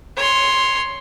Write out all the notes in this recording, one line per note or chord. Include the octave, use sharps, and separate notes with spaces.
C#5 C6